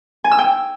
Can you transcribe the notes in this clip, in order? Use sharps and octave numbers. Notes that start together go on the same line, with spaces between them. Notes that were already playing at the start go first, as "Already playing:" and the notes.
G#5
E6
G5